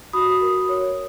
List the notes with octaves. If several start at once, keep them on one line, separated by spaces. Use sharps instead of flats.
F#4 B5 D#6
A#4
C#5